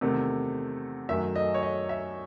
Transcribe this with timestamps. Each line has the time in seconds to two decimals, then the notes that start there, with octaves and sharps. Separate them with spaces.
0.01 E2 C3 D#3 A3
1.09 F#2 D#3 F#3 A3 E5
1.36 D#5
1.54 C#5
1.63 D#5
1.89 E5